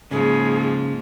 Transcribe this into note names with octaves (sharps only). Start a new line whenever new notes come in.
G#2 C#3 F3 A#3 G#4